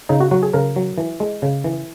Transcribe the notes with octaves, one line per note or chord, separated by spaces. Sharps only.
C#3 D#4
F#4
F#3 F#4
G#4
C#3 A#4
F#3
E3
G#3
C#3
E3